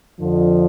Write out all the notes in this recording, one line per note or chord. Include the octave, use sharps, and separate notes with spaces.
F2 D3 F3